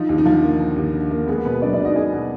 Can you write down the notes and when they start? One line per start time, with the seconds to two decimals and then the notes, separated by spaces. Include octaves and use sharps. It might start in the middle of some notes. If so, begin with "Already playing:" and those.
Already playing: F3 D#4
0.09 D#2
0.18 D#4
0.25 D3 F3 F4
0.43 A#3
0.59 F3
0.76 D#2
0.94 D3
1.11 A#3
1.27 G#3 B3 G#4
1.45 B2 B3 B4
1.62 F#3 D4 D5
1.74 D4 D5
1.79 B2
1.85 D#4 D#5
1.96 B3 G#4 G#5
2.13 B2